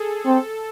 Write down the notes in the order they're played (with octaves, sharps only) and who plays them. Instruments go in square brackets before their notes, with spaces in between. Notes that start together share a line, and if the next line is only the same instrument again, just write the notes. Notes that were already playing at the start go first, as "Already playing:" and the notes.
Already playing: [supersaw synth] G#4 A4
[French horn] C4 [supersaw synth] A4